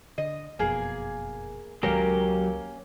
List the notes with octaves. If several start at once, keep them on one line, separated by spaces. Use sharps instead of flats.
D3 D#5
F#1 F2 B2 A#3 G#4
C#2 D#3 F#3 G#3 A#3 C#4 G4 A#4